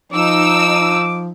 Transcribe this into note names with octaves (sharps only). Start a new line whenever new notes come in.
F3 D#4 D6 E6